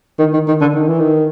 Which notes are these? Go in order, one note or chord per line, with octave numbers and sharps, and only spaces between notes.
D#3
D#3
D#3
D3
D#3
E3
D#3